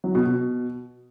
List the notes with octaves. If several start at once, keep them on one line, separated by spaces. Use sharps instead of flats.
F#3
B2
B2